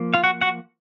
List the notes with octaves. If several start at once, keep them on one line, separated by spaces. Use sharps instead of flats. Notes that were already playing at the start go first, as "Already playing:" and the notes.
Already playing: F3 A#3
F4 F5
F#4 F#5
F#4 F#5